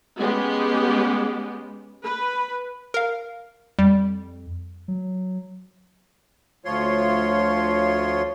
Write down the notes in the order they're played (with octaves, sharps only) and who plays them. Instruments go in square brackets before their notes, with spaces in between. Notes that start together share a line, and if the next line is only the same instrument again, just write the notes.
[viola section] G#3 B3 C#4 G4
B4
[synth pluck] A#4 F5
[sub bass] F2 [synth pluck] G3
[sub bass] F#3
[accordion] D2 F3 F4 C#5 C6